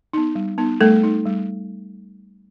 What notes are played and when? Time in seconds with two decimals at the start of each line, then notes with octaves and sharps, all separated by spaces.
0.13 B3 D#4
0.35 G3
0.58 B3 D#4
0.81 G3 A3 A4
1.03 D#4
1.26 G3